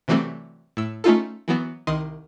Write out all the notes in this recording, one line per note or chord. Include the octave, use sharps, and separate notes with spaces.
C3 E3 F#3 G3 A3 C4
A2 E6
A3 C#4 D#4 F4 A4
E3 F#3 B3
C2 D#3 D#5 C6